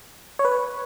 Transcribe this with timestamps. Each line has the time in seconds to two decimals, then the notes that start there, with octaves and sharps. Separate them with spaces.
0.39 C#5
0.45 B4